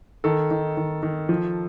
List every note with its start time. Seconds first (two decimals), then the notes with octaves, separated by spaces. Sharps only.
0.24 D#3 A4
0.51 D#3
0.77 D#3
1.03 D#3
1.29 F3